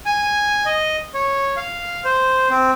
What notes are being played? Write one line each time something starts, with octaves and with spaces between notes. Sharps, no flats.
G#5
D#5
C#5
F5
C5
C4